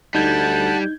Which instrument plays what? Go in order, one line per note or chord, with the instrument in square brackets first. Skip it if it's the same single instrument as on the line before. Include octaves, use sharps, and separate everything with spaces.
[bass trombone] D2 [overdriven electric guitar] G3 [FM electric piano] D#4 G6 G#6 [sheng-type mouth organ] F#5 A5